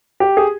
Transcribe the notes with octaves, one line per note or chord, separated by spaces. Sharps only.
G4
G#4